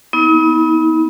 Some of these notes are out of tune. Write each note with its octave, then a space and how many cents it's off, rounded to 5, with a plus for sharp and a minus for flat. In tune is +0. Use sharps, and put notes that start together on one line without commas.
B3 -15 D#4 +45